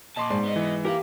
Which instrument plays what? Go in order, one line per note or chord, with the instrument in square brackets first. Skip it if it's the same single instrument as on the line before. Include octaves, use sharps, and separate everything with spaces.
[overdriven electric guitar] A#2 A5 [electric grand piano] D#5 C6 D6
[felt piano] G#2 [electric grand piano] C5 D5 C6
[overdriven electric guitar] B3 D#5
[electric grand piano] E3
[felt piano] G4 [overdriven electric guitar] A#4 F5